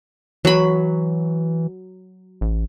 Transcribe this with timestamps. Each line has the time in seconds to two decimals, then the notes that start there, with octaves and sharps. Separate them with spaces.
0.45 E3 F#3 B5
2.41 A1